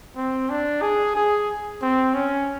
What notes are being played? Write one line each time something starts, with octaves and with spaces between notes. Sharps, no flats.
C4
D4
G#4
G#4
C4
C#4